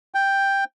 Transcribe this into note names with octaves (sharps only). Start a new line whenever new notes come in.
G5